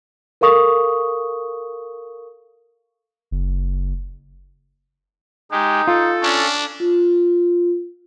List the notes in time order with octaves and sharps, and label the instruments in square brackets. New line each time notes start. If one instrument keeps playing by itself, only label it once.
[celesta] A4 A#4 F5 C#6 D#6
[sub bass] F#1
[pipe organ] G#3 G4 [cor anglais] D#4
[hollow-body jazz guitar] F4 [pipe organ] A4
[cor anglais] C#4 [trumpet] D4
[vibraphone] F4